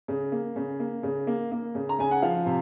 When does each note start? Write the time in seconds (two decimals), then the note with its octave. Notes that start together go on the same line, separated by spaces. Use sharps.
0.08 C#3
0.32 A#3
0.56 C#3
0.80 A#3
1.03 C#3
1.27 A#3
1.52 A#3
1.75 C#3
1.89 A#5
1.99 C#3 G#5
2.11 F#5
2.22 F3 F5
2.46 C3